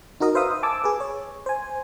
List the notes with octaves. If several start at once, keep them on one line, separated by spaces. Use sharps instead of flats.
D#4 F#4 A#4 D#5
B4 C5 E5 F5 D#6
G#5 A5 D6 E6
G#4 B4
C#5
C5 G#5